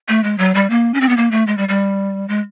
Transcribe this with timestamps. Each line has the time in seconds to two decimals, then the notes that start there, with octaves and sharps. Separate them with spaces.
0.08 A3
0.24 G#3
0.38 F#3
0.55 G3
0.70 A#3
0.94 C#4
1.01 C4
1.09 B3
1.17 A#3
1.31 A3
1.47 G#3
1.58 G3
1.69 G3
2.28 G#3